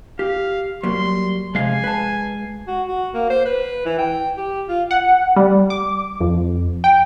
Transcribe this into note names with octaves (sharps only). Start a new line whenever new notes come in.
G4 F5
F#3 G3 A#3 C6
B1 F2 C3 G#3 F5 G#5
B4 A5
F#4
F#4
A#3
C5
B4
E3
G5
G4
F4
F#5
G3
D6
F2
G5